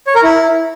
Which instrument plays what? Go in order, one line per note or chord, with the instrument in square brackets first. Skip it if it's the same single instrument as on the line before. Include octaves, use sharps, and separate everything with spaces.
[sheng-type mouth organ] C#5
A#4
E4